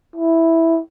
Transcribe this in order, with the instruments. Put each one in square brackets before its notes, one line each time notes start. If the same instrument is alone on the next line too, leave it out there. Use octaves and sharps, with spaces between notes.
[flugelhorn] E4